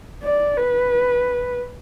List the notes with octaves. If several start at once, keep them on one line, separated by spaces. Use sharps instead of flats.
D5
B4